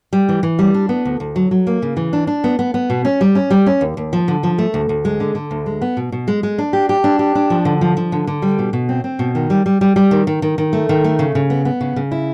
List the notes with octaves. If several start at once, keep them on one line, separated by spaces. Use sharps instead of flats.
G3
E3
E3
G3
D4
B3
D2
D2
F#3
F#3
A#3
C#3
E3
D4
D4
B3
B3
B3
B2
C#4
G3
C#4
G3
C#4
D#2
D#2
F3
D3
F3
A3
D2
D2
G#3
D3
D3
D2
G#3
B3
B2
B2
G#3
G#3
D4
G4
G4
D4
G4
D4
F3
D3
F3
F3
D3
D3
G3
B2
B2
C4
C4
B2
D#3
G3
G3
G3
G3
D#3
D#3
D#3
D#3
A3
D#3
A3
C#3
C#3
B3
B3
C#3
C#3
E4